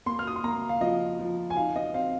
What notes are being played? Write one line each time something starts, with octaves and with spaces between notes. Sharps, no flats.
A#3 C6
F6
D#6
C6
A#3 A#5
F5
F3 D#5
F3
G#5
D#4 F5
D#5
C4 F5